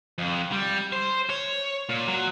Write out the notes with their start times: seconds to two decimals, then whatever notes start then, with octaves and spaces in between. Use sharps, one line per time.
0.18 F2
0.52 G3
0.93 C5
1.30 C#5
1.89 A#2
2.08 F#3